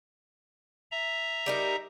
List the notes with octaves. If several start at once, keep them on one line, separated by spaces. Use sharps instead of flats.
E5 A#5
G3 D#4 A#4